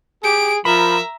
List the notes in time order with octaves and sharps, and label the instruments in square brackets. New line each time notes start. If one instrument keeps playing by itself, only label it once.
[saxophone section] G4 [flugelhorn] G#4 [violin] D7
[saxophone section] F3 [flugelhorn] A#4 [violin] E5 A#5 [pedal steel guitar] B5